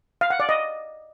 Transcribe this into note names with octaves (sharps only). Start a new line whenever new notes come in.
F5
F#5
D5
D#5